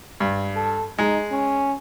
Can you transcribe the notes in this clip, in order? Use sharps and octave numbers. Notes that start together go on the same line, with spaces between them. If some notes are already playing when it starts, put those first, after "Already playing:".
G2
A4
G#3 D#4
C#4